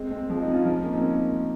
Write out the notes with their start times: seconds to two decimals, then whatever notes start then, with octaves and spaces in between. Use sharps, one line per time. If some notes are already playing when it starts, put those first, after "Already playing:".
Already playing: G#3 C4
0.11 G#3 C4
0.29 F3 G#3
0.42 C4 D#4
0.53 C#4 F4
0.65 F3 G#3
0.84 A#3 C#4
0.93 C4 D#4
1.02 A#3 C#4